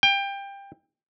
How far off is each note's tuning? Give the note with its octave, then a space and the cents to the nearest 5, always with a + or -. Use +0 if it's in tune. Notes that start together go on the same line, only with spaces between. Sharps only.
G5 +20